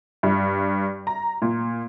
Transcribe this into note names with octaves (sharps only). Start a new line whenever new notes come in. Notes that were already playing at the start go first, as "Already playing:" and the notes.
G2
A#5
A#2